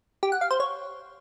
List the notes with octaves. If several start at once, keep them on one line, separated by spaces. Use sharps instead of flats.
G4
F#5
F5
C5
C#5